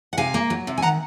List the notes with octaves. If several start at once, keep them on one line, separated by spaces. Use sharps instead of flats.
F#5
C3 F5 G#5
A#3
F#3
C3
G#5
D#3 F#5 A#5